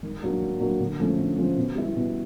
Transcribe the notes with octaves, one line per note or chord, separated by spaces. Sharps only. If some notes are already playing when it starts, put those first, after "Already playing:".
D#3
F#3 A#3 D4
D#3
F#3 A#3 D4
D3
F3 A3 C#4
D3
F3 A3 C#4
B2
G3 B3 E4
B2